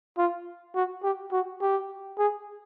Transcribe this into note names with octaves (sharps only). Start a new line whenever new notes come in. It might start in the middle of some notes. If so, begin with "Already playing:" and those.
F4
F#4
G4
F#4
G4
G#4